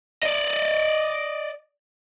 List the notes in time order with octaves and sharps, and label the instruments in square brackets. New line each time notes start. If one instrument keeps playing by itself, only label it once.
[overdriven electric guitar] D5 D#5